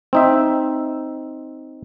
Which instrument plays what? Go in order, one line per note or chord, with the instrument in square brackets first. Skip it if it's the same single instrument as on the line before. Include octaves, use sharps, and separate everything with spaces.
[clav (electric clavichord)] C4 D#4 E5